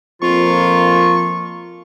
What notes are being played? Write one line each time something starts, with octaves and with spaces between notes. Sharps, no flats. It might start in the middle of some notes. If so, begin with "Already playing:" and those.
F2 F3 A#3 F4 C#6